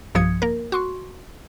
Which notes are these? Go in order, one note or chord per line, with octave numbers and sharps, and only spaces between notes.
B1 G2 F3 D#6 G#6 C#7
A#3 A#4
F#4 C6 C#6